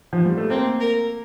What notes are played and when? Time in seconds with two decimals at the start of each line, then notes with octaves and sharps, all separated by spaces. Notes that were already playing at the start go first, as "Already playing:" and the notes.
0.13 F3
0.25 G3
0.38 A3
0.50 A#3 C4
0.80 A#4